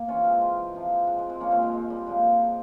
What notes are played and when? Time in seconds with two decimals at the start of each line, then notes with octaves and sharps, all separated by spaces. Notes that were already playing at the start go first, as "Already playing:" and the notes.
Already playing: A#3
0.08 C3 E3 C#4 F4
0.24 G#3 C4
0.41 G#3
0.75 C3 F3
1.07 G#3
1.18 G#3
1.29 G#3 C4
1.40 A#2 F3 A#3 C#4
1.51 G#3 C4
1.63 G#3
1.74 G#3
1.90 G3
2.06 A#2 F3 G#3